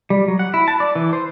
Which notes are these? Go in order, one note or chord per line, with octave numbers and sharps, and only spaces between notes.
G3
F#3
F#5
E4
A5
D5
E3
C5